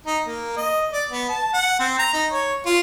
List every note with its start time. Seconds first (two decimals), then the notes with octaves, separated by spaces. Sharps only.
0.06 D#4
0.26 A#3
0.57 D#5
0.92 D5
1.10 B3
1.29 A5
1.53 F#5
1.79 C4
1.99 A#5
2.13 D#4
2.32 C#5
2.66 F4